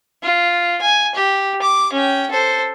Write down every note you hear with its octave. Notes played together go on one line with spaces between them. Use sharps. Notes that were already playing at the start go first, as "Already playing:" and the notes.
F4
G#5
G4
D6
C#4 G5
A4 C5